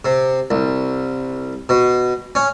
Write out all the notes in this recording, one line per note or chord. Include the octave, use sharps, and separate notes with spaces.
C3
C2
B2
C#4